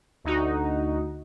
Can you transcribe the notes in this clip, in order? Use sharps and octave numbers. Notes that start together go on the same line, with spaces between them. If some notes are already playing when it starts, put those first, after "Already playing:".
D2 D#4 F#4